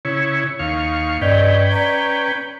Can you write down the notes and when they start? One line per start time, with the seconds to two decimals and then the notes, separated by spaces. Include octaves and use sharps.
0.05 C#3 E4 C#5
0.59 D#2 F5 C#6
1.21 G2 C#4 B4 D5 D#5 G5
1.72 D5 A#5 B6